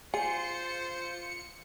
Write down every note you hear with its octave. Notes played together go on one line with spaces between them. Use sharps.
F4 G#4 C5 C#7